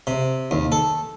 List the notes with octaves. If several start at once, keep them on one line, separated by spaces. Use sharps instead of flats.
C3
D#2
A4